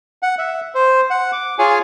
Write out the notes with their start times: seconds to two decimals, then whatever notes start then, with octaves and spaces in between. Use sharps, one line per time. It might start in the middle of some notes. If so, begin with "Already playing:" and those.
0.23 F#5
0.38 E5
0.75 C5
1.10 F#5
1.32 D6
1.59 F4 G#4 C#5 G#5